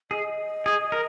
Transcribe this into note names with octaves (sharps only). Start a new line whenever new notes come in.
G#4 D#5
G#4
A#4